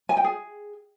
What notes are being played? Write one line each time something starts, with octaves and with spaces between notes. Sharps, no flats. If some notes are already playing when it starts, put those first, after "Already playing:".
G#5
G5
G#4